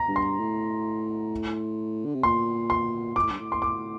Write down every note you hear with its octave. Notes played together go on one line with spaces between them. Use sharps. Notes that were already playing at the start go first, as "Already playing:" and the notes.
Already playing: A#5
G2
C6
A2
D3
C3
A#2 C6
C6
A#2 D6
A2
G2
A2
C6
D6